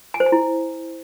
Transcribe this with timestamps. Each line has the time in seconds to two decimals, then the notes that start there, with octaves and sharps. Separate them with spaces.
0.14 G#5
0.20 C5
0.26 G#5
0.32 E4